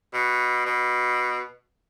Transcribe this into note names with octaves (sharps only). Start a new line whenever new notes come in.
B2
B2